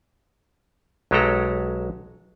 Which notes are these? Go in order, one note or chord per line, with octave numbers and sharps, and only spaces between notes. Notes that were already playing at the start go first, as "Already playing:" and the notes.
B1 F#3 G#3 G4 A4 A#5